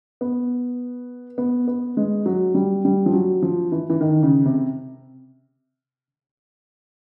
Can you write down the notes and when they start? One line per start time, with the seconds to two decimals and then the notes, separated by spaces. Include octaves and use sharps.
0.21 B3
1.38 B3
1.68 B3
1.97 G#3
2.26 F#3
2.55 G3
2.85 G3
3.06 F3
3.13 F#3
3.42 F3
3.72 E3
3.90 E3
4.01 D#3
4.23 C#3
4.46 C3